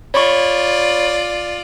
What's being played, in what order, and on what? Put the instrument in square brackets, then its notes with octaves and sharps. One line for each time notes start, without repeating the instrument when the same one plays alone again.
[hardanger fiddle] F4 D5 [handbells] C#5 B5 C#6